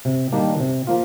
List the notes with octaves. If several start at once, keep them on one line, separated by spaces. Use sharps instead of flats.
C3
D#3 G3 A#3 D4
C3
F3 A#3 F4